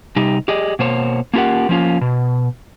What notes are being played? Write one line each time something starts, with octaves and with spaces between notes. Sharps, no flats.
C3 G3 D#4 G4
G4 G#4 D5 D#5
B2 A#3 C5 C#5
A#3 C#4 F4 G4 A#4 F#5
F3 A#3 C#4 F4
B2